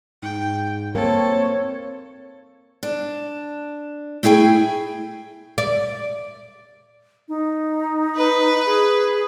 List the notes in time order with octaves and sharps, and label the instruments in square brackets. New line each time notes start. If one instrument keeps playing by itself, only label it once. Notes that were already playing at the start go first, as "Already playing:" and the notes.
[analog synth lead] G#2 [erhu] G5
[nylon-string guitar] A#3 [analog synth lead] C4 [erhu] A4 [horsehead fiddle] C#5
[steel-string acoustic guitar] D4
A3 E4 G#4 G5 G#5
[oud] D5
[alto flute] D#4
[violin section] B4
[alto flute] G#4